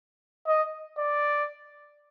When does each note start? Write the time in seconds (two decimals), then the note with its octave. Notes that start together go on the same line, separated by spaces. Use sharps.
0.47 D#5
0.99 D5